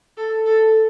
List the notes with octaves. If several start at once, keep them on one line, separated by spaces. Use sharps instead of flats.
A4
A4